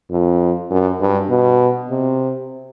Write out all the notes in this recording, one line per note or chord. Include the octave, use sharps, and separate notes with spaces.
F2
F#2
G2
B2
C3